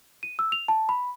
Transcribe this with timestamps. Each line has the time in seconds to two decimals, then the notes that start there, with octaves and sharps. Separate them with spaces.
0.23 D#7
0.39 E6
0.52 F7
0.68 A5
0.89 B5